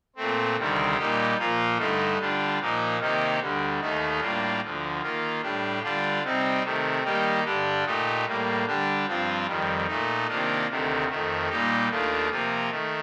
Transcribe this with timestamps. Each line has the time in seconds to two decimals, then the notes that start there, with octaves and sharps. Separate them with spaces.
0.16 A#2 A3 C4
0.56 D2 C3 D#3 G3 C4
0.97 A#2 G3 A#3 D#4 G4
1.38 A#2 F3 A#3 F4
1.77 G2 D3 A3 D#4
2.18 D3 G3 D4 F4
2.59 A#2 F3 A#3 D#4
2.99 C3 D#3 A#3 D#4 G4
3.39 D2 D3 G3
3.81 D#2 D#3 A3 D#4
4.20 A2 G3 A#3 D4 F4
4.61 D2 D3 F3
5.01 D#3 A#3 F4
5.42 A2 G3 D4 G4
5.83 D3 G3 D4 F4
6.23 C3 G3 C4 D#4
6.63 C3 D#3 A3
7.03 D#3 G3 A#3 D#4 G4
7.44 G2 D3 G3 D4 G4
7.85 A#2 A3 D#4 G4
8.25 A2 G3 A#3
8.65 D3 G3 D4 G4
9.06 G2 F3 C4 F4
9.46 F2 D#3 G3
9.87 A#2 A3 D#4
10.28 C3 D#3 A#3 D4 F4
10.68 D2 C3 D#3 A3
11.09 F2 D#3 A3
11.49 A#2 G3 A#3 D#4 G4
11.89 D#2 D#3 A3 D4 F4
12.30 C3 F3 A#3 F4
12.70 D#3 A3